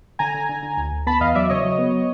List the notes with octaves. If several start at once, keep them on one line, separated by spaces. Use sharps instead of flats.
D3 G#5 A#5
D3
D3
D3
D2
D2
B3 A5 B5
E2 D#5 F5
F#3 D5 E5
C#3 C#5 D#5
F#3
B3